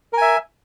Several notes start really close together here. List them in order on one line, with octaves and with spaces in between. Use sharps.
A#4 G#5 E5